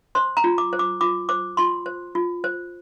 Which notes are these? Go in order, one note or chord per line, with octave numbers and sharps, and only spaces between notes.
C5 C6
A#5
F4
D6
C5
D6
F4 D6
C5 D6
F4 C6
C5
F4
C5